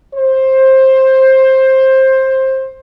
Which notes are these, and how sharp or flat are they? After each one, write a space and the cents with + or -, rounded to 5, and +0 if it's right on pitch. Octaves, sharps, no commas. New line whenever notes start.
C5 +15